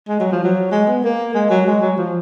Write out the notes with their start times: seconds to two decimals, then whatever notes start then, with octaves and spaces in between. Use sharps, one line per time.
0.08 G#3
0.20 F#3
0.32 F3
0.44 F#3
0.72 G#3
0.88 B3
1.04 A#3
1.35 G#3
1.50 F#3
1.67 G#3
1.82 F#3
1.98 F3